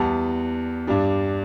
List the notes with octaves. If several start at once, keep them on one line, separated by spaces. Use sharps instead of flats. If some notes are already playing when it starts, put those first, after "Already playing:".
Already playing: E2 E3 G3 B3 A5
G2 G3 D4